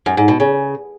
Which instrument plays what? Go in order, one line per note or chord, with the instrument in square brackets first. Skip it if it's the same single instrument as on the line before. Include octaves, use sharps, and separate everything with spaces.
[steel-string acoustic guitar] F#2
G#2
B2
C#3